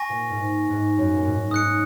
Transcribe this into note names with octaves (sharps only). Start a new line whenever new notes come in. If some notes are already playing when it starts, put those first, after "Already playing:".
Already playing: G#5 C#6 A#6
A#2
G#2
G#2
F#2
A#2
G#2
G#2 D#6 F#6 C#7